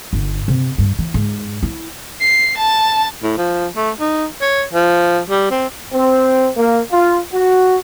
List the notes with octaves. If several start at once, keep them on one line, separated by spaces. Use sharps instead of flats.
G1
C3
G2
E3
G#2
E4
C7
A5
A2
F3
A3
D#4
C#5
F3
G3
C4
C4
A#3
F4
F#4